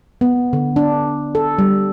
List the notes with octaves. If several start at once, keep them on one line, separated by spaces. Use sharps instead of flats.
B3
D3
D4
A4
G3